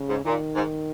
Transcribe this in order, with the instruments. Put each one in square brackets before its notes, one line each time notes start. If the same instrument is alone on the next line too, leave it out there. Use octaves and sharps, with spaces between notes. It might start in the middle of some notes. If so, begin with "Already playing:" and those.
Already playing: [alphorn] C#3
[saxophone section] G#2
[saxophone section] A#2 [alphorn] D#3
[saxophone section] G#2